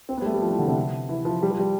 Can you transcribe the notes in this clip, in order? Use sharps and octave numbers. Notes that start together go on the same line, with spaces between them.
C4
B3
G3
A3
G3
F3
E3
D3
C3
E3
F3
G3
F3
G3